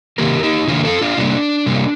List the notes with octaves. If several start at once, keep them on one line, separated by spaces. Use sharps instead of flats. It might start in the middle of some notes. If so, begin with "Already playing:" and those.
C3 D#3 A#3 G4 A#4
D#4 G4
C3 D#3 A#3 D4 F4
F4 A4
D4 F4
C3 G3 A#3 D4
C3 G3 A#3